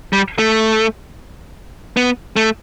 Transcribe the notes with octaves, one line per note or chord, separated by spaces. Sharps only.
G3
A3
B3
A3